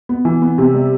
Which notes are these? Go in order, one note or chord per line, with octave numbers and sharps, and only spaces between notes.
B3
E3
B3
C3
G3